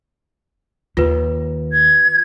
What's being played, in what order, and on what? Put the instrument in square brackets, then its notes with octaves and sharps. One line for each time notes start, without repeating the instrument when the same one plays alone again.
[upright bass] D#2 [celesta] F4 B4
[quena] G#6